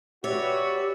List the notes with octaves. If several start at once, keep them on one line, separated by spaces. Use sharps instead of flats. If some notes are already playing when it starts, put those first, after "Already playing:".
F#4 G4 B4 C#5 D5 E5